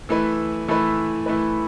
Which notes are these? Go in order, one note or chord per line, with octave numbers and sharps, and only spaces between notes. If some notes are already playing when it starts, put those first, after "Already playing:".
E3 A3 E4 B4
E3 A3 E4 B4
E3 A3 E4 B4